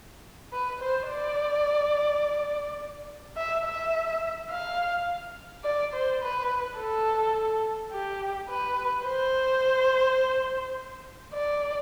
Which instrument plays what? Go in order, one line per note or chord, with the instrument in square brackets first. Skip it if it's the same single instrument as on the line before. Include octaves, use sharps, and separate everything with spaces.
[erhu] B4
C5
D5
E5
E5
F5
D5
C5
B4
A4
G4
B4
C5
D5